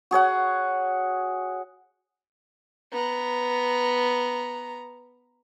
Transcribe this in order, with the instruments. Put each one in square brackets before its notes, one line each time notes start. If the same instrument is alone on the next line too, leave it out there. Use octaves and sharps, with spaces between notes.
[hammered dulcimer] F#4 G#4 C#5 F#5
[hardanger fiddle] B3 A#5